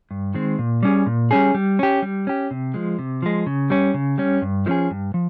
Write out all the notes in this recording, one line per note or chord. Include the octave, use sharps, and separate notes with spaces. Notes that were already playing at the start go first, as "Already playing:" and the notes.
G2
D#3 G#3 C4
A#2
G3 C#4 G#4
A#2
G3 C#4 G#4
G3
C#4 G4
G3
C#4 G4
C3
F3 G#3
C3
F3 G#3
C#3
G3 C#4
C#3
G3 C#4
G2
F3 G#3 C#4 G#4
G2
F3